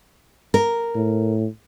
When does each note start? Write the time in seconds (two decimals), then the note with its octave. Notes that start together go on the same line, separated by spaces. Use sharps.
0.54 A#4
0.95 A2